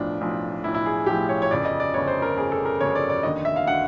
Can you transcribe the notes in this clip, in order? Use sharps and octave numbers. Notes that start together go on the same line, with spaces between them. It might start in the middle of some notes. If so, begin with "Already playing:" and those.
Already playing: B1 A2 F3 D4
B1 A2 F3
B1 A2 F3 E4
E4
G#4
B1 A2 F3 G4
C#5
C#5
G1 F2 C#3 D5
D#5
D5
G1 F2 C#3 C#5
C5
A#4
G1 F2 C#3 G#4
A4
A#4
G1 F2 C#3 C#5
D5
D5
F1 D#2 D3 D#5
E5
F5
D3 F#5